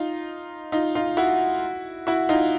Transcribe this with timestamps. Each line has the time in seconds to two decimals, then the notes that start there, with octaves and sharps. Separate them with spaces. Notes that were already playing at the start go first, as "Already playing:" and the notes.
Already playing: D#4 F4
0.72 D#4 F4
0.95 D#4 F4
1.17 E4 F#4
2.07 E4 F#4
2.29 D#4 F4